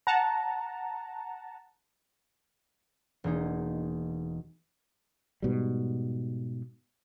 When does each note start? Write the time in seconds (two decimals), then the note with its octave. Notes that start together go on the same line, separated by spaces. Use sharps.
0.07 F#5 A5 A#5
3.24 E1 A#3 D#4
5.42 G#2 B2 G3